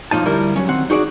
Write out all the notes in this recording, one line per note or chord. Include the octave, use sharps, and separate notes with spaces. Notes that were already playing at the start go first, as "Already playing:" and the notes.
B1 E3 F3 D#4 A5
D2 G3 E4 A#4
F#3 C#4
D#3 C4 F#5
D#4 F#4 G#4 D5